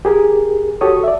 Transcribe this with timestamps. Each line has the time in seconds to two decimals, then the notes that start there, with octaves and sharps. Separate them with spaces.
0.05 G4 G#4 A#4
0.81 F#4 G4 A4 C#5 D#6
1.04 D5 E5